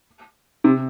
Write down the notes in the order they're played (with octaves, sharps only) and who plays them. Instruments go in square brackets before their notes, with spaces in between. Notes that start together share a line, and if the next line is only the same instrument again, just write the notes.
[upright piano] C3